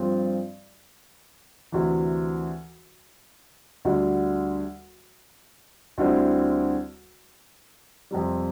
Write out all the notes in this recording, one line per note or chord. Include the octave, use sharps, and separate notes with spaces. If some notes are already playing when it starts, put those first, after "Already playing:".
Already playing: G2 F3 C4 F4
D2 C3 E3
D2 D3 G3
D2 D3 G3 C4 E4
F2 C3 G3